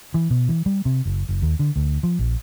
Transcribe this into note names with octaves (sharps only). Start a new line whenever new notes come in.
E3
B2
E3
G3
C3
F#1
F#1
D#2
D3
D2
F3
A#1